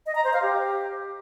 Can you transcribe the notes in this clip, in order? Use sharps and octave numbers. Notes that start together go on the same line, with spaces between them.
D#5
A#5
C5
F5
G4